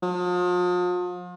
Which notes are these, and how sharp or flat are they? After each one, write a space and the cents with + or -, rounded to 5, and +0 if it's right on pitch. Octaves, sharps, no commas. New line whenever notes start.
F3 +40